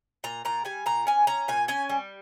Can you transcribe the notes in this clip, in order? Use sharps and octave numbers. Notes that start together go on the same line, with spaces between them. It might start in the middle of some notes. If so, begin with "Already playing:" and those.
A#2 A#5
A#2 A#5
G3 G#5
A#2 A#5
C#4 G#5
C#4 A#5
A#2 G#5
C#4 G#5
G3